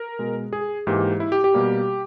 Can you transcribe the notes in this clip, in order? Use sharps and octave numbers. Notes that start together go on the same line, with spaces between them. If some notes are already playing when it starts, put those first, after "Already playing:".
Already playing: A#4
B2 G#3
G#4
G#2 E3 A#3 G4
E4
G4
G4
B2 G3 A#3